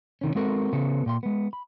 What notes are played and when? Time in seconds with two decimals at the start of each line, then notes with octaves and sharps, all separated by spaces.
0.21 C3 D#3 C#4
0.35 G#3 B3 C4 F#4 A4 A#4
0.73 C#3 B3 A4
1.06 A#2 G5 C6
1.23 G#3 B3
1.53 B5